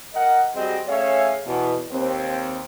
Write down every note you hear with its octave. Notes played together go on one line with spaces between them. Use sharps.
A#4 D#5 F#5
G3 C4 F#4 G#4 D#5
A3 C#4 G#4 C#5 E5 F5
E2 B2
D#2 C4